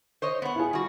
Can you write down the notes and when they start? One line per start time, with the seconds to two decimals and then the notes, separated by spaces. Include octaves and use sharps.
0.22 C5 C#5 D#5
0.42 B3 F#5
0.55 E4 F4 G#4
0.73 G3 F#4